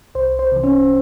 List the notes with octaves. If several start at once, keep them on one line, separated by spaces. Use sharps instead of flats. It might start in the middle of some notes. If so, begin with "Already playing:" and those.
C2 C5
C5
C3 E3
C#4